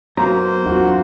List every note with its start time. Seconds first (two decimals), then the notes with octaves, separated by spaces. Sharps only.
0.17 F#2 A#3 B3 C5 C#5 A#5
0.66 E2 C4 D4 F4 F#4